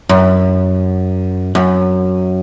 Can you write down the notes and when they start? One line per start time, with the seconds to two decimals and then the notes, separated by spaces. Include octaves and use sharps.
0.09 F#2
1.55 F#2